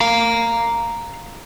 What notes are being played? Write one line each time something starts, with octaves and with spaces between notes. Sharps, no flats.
F5 A#5